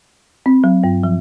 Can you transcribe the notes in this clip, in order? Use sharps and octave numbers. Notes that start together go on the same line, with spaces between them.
C4
F#3
G2
F3